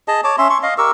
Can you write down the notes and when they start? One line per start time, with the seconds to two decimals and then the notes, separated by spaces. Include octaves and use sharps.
0.08 G#4 D#5 A5
0.24 C#5 A5 D6
0.38 C#4 E5 C6
0.50 C6 C#6
0.63 D#5 F5
0.78 G4 A#4 C#6 E6